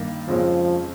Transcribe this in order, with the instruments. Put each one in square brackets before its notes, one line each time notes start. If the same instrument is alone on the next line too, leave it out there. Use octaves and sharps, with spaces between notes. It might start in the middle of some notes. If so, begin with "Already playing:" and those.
Already playing: [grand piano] G2 D#3 A#3
[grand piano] F2 C#3 G#3 C#4 [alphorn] F3